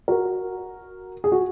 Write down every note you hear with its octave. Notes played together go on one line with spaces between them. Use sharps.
F#4 A#4
G#4
F#4